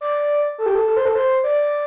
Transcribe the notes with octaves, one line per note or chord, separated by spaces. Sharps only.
D5
A4
G4
A4
A4
C5
A4
C5
D5